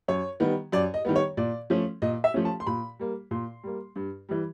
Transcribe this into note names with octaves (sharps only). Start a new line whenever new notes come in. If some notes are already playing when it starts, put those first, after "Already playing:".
F#2 C#5
D#3 G3 B3
F#2 D5
D#5
D#3 G3 B3
C#5
A#2 D5
F3 A3 C#4
A#2 D#5
E5
F3 A3 C#4
A5
C6
A#2 B5
G3 A#3
A#2 C6
G3 A#3
G2
E3 G3